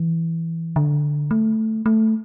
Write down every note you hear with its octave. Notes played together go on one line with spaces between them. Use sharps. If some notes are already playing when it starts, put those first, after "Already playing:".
Already playing: E3
D3
A3
A3